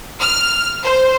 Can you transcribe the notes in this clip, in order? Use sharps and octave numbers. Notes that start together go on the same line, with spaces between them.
F6
C5